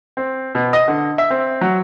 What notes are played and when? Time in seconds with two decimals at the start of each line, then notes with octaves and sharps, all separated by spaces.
0.17 C4
0.55 B2
0.73 D#5
0.88 D3
1.18 E5
1.30 C4
1.61 F#3